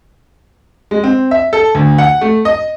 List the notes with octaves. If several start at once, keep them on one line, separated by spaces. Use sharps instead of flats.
G#3
C4
E5
A4
D2
F#5
A3
D#5